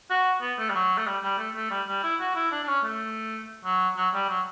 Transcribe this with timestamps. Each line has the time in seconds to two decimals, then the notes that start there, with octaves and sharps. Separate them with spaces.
0.10 F#4
0.42 B3
0.59 A3
0.70 G3
0.75 F#3
0.98 A3
1.07 G3
1.23 G3
1.38 A3
1.56 A3
1.71 G3
1.88 G3
2.04 E4
2.20 F#4
2.35 E4
2.52 D4
2.64 D4
2.68 C#4
2.84 A3
3.65 F#3
3.97 F#3
4.14 G3
4.29 F#3